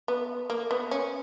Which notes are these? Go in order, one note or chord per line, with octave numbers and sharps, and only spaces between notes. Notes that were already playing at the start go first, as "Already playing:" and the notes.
B3
A#3
B3
C#4